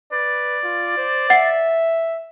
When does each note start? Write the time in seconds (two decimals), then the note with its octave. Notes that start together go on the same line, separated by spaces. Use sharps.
0.12 B4 D5
0.64 F4
0.97 C5
1.30 E5 F#5 A6 C7